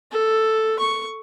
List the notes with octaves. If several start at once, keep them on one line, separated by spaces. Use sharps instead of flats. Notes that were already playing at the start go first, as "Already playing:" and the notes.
A4
C#6